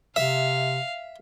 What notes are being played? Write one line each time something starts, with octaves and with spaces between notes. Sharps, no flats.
C3 E5 F5